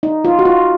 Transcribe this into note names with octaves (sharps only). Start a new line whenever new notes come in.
D#4
F4
F#4
F4